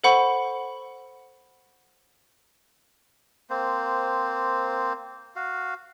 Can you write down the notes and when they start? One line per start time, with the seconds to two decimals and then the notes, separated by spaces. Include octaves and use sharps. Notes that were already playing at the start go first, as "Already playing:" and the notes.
0.04 A4 C5 F#5 B5 C#6
3.50 A#3 C4 C5
5.36 F#4 F5